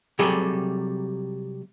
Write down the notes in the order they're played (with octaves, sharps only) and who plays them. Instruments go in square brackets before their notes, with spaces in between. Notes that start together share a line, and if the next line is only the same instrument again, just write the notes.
[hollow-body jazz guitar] C3 F#3 G3 G#4 A4